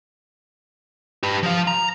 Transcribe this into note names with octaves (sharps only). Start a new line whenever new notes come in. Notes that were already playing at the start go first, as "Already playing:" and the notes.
G4 B4
F3 F5
A#5